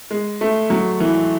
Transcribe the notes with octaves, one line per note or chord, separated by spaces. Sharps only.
G#3
A3
F#3
E3